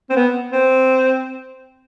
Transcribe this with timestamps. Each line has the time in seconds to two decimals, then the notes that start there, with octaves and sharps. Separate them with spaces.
0.10 C4
0.16 B3
0.52 C4